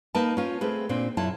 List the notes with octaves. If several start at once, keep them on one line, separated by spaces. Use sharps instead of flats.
A#3 D#4 A#4 B4 A5
C#4 F4
A3 C4 G#4 B4
A#2 C4 D4
F#2 E4 F4 A5